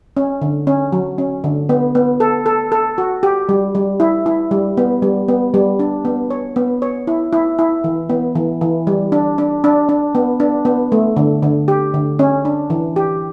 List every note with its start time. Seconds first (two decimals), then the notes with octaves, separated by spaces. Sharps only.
0.17 C#4
0.42 D3
0.67 C#4
0.92 F#3
1.18 C#4
1.44 D3
1.69 B3
1.95 B3
2.20 A4
2.46 A4
2.72 A4
2.98 F#4
3.23 G4
3.49 G3
3.75 G3
4.00 E4
4.26 E4
4.51 G3
4.77 B3
5.02 G3
5.28 B3
5.54 G3
5.79 D4
6.05 B3
6.30 C#5
6.56 B3
6.82 C#5
7.07 E4
7.33 E4
7.59 E4
7.84 E3
8.10 B3
8.35 E3
8.61 E3
8.87 G3
9.12 D4
9.38 D4
9.64 D4
9.89 D4
10.15 B3
10.40 D4
10.65 B3
10.92 A3
11.16 D3
11.42 D3
11.68 G4
11.94 D3
12.19 C#4
12.45 D4
12.70 E3
12.96 G4